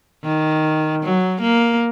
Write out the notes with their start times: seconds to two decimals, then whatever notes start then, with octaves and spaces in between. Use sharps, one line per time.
0.23 D#3
1.03 F#3
1.42 A#3